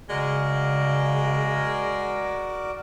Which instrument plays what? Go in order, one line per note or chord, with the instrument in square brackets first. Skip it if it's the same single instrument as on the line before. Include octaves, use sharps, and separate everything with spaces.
[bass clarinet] C#3 [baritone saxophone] G#3 [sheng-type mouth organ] F#4 A#4 D5